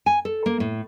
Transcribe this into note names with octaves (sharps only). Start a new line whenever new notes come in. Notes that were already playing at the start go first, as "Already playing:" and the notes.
G#5
A4
A#3
A2